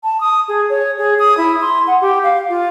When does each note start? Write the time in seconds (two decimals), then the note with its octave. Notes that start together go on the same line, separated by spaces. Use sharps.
0.04 A5
0.21 D#6
0.48 G#4
0.70 C#5
0.98 G#4
1.19 D#6
1.38 E4
1.61 C6
1.87 F#5
2.01 G4
2.23 F5
2.49 F4